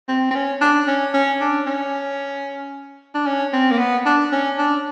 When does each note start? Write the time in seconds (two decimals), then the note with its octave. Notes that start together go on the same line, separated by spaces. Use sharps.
0.08 C4
0.31 C4
0.35 C#4
0.61 D4
0.87 C#4
1.14 C#4
1.40 D4
1.67 C#4
3.15 D4
3.26 C#4
3.53 C4
3.71 A#3
3.78 B3
4.05 D4
4.32 C#4
4.58 D4